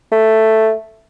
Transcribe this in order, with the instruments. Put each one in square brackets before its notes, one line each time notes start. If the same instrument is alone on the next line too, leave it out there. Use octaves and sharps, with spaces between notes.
[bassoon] A3